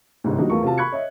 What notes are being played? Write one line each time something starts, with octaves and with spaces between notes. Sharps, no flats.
G1 C2 G#2
F3 G3 A#3 D4 D#4 F#4
E2 A3 F4 A#4 C#6
C3 F4 F#4 A5
B5 C#6 F#6 G#6 C#7
C#5 D#5 E5